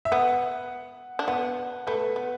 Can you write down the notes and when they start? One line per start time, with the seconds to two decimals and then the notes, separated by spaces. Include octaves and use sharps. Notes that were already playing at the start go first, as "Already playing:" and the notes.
0.05 E5
0.12 B3 F#5
1.19 D4
1.28 B3 F#5
1.87 A3 B4
2.16 B3